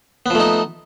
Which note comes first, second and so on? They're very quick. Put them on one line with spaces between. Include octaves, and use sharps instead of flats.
B3 F3 A3 D#4